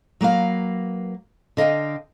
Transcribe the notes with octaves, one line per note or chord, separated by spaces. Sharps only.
F#3 A#3 B4 F5
D3 D#5 F5 G5